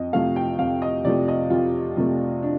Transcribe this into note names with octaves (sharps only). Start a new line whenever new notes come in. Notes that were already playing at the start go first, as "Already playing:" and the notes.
Already playing: F2 D#5
C3 F3 A3 F5
G5
F2 F5
D#5
C3 F3 A3 D5
D#5
F2 F4
C3 F3 A3
D4